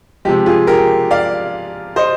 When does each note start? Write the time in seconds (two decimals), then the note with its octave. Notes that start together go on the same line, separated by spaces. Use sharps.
0.25 C3 F3 G#3 G4
0.46 F4 G#4
0.67 G4 A#4
1.11 D5 F5
1.96 C5 D#5